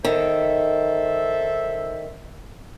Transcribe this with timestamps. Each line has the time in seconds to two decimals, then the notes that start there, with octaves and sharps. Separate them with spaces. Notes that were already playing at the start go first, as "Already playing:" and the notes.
0.04 D#3 A4 C5 E5